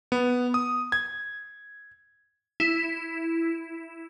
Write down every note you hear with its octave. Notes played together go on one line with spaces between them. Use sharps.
B3
D#6
G#6
E4